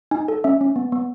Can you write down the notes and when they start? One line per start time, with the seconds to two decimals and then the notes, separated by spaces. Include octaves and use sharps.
0.11 D#4 G#5
0.28 A4
0.44 C#4 E5
0.61 C#4
0.76 B3
0.92 B3